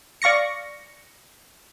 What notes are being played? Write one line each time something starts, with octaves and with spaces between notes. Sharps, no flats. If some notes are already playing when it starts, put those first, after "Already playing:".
D5 F5 C#6 A#6 C#7